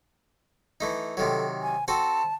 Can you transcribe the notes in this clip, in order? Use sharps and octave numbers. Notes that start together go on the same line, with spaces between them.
E3 A3 D#4
C3 D#3 F#3 A4
G#5
C4 F#4 A4 A5